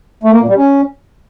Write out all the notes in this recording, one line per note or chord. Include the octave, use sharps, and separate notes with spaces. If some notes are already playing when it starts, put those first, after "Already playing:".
A3
A#3
A#2
G3
C#4